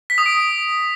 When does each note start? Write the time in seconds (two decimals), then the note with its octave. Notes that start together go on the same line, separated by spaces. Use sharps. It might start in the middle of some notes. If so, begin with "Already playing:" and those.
0.10 B6
0.18 D#6
0.26 D7